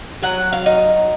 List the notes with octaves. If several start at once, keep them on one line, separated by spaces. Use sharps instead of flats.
F#3 F#5
F5
D#4